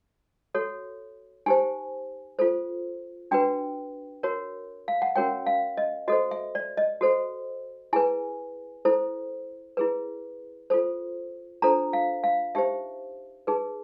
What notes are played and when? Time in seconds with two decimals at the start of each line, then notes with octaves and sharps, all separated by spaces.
0.54 F#4 A4 C#5
1.46 D#4 G4 C5 G#5
2.39 F4 A4 C5
3.31 D4 F#4 B4 G5
4.23 F#4 A#4 C#5
4.88 F5
5.02 F#5
5.16 C#4 F#4 A#4 C#5 G5
5.46 F5
5.77 D#5
6.08 F#4 A4 C5 D#5
6.31 E5
6.55 D5
6.77 D#5
7.01 F#4 A4 C5
7.93 E4 G#4 B4 G#5
8.85 E4 A4 C5
9.77 E4 G#4 B4
10.70 F4 A4 C5
11.62 D4 F4 A4 C5 A#5
11.93 F5
12.24 F5
12.55 D#4 G4 C5 E5
13.47 D#4 G#4 B4